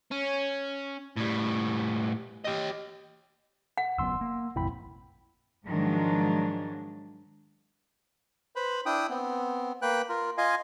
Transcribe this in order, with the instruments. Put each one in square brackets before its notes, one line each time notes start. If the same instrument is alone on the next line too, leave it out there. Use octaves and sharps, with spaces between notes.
[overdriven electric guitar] C#4
A2 G3
G4 D#5
[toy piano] F#5
[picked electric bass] F#1 F#2 B3 [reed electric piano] C6 E6
[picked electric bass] A#3
[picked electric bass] A#1 F2 C3 [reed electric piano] E4 G5 B5
[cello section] G#2 D#3 F3 F#3 G#3 D4
[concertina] B4 C5 B5
D4 E4 G5 D#6
B3 C4
A#3 B4 G5 F#6
F4 A#4
F4 D#5 F5 G#5